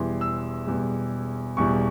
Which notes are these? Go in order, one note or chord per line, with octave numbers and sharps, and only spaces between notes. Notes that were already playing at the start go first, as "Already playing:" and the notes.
Already playing: E1 E2 E3 G3 C6
E6
E1 E2 E3 G3
E1 E2 E3 G3 C#6